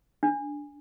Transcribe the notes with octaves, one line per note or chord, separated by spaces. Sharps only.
D4